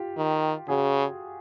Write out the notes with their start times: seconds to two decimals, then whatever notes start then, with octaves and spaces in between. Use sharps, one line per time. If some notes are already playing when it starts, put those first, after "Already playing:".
Already playing: F4 G4
0.18 D#3
0.68 C#3 F#4 G#4